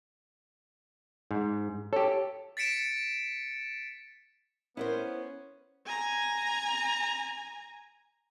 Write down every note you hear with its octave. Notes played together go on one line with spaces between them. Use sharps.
G#2
G4 A4 C#5
A6 B6 C#7 D7 E7
B3 C#4 E4 A#4 C5
G#5 A#5